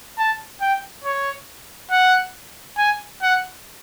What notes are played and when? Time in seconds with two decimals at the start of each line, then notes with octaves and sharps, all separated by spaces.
0.18 A5
0.61 G5
1.04 C#5
1.91 F#5
2.78 G#5
3.22 F#5